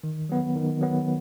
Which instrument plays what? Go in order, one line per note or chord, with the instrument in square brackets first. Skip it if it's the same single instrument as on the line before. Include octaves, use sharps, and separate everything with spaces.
[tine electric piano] D#3
F#3 B3
D#3
F#3 B3